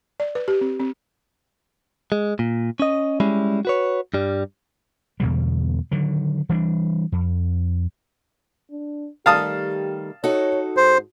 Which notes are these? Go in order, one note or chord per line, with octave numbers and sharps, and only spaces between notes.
D5
B4
G4
C4
C4
G#3
A#2
C#4 D#5
G3 G#3 C#4 E4
F#4 B4 C#5
G2 G3
E2 B2 D3 G3
D3 D#3 F#3
E3 G3 C4 D4
F2
D4
D#3 G3 A3 G4 F5 A5 D#6
D#4 F#4 A4 C#5
G#2 C5